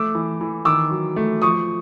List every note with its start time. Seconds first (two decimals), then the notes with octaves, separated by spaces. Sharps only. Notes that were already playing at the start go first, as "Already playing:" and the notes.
Already playing: A3 D6 E6
0.15 E3
0.41 E3
0.65 D#3 D6 E6
0.91 F#3
1.16 A3
1.42 F3 C#6 D#6